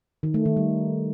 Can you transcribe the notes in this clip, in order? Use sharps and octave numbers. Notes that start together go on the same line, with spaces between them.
D#3
A3
D#3
G3